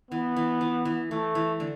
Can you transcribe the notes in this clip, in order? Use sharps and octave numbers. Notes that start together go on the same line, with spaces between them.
E3 B3
E3
E3
E3
E3 A3
E3
D3